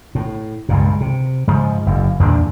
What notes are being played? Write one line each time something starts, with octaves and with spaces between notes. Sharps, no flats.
A2
C#2 G2 A#2
C3
G#2 C#3 F3
F#1 F#2
E2 A#2 D4